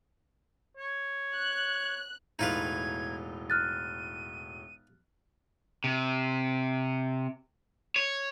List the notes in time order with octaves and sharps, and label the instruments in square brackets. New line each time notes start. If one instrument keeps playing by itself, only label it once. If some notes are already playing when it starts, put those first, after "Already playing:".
[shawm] C#5
[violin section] F#6
[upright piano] E1 A2 [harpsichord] D#4 F4 B4 [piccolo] G#6
[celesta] F6 F#6 A6 [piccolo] D#7
[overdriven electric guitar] C3
C#5